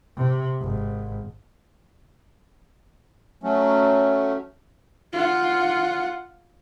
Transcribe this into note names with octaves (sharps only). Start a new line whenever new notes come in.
C3
G#1
F#3 A3 C#4
F4 F#5